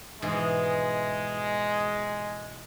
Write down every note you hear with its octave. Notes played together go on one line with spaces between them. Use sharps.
G#2 B2 E3 G#3